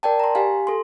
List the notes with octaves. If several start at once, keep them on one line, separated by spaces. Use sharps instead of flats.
A#4 D5 G5 A5
A#5 C6
G4 F5 G#5
A4 C6